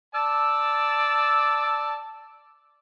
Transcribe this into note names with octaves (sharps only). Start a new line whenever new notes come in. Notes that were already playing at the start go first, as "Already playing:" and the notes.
D5 A5 E6